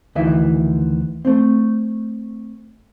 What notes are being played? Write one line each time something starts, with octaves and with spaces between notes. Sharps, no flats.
D2 D#3 E3 E5
A3 C4